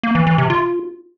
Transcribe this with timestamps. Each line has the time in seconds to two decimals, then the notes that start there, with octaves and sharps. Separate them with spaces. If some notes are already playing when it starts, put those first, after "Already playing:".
0.03 A#3
0.15 E3
0.27 E3
0.38 C3
0.50 F4